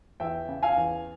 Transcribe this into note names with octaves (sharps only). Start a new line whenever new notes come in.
E2 E5 G5
C#3
F5 G#5
E2